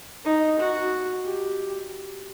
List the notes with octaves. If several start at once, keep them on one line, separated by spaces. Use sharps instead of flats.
D#4
F#4
G4